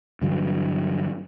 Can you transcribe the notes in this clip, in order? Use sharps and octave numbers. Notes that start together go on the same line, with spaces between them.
G2 D3 E3 F#3